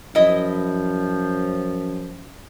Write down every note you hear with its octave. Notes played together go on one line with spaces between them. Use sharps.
F#2 F3 E4 D#5